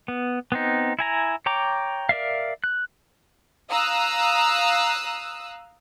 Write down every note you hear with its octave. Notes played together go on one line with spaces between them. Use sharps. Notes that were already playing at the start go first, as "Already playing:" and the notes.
B3
B3 C4 D#4
E4 G#5 A#5
C#5 G5 A#5 D6
A#4 D5 E5 F5
F#6
F5 A#5 D#6 E6 F#6